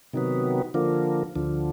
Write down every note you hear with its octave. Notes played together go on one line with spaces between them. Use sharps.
C3 D#3 F#3 B3
D3 F3 A#3
D2 D3 F3